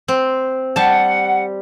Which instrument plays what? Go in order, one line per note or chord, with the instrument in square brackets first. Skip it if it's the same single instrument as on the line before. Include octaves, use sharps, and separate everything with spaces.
[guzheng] C4
[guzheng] G3 A5 [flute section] F#5